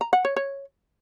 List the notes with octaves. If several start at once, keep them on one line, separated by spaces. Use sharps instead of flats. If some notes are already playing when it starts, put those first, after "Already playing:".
A#5
F#5
C#5
C#5